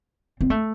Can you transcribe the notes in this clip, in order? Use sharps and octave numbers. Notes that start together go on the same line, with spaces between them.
C4
A3